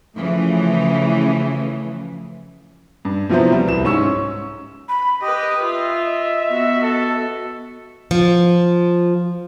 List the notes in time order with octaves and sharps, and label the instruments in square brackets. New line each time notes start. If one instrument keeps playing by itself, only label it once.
[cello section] C#3 E3 F3 A3
[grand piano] G2
C3 F3 F#3 B3 E4 C5
G3
C2 E7
G#2 C#4 C#6 E6
[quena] B5
[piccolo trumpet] G4 [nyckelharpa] B4 D#5 [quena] D#6
[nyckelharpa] F4 [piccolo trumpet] E5
[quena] D#5
[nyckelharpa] B3 F#4
[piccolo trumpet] A4
[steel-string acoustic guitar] F3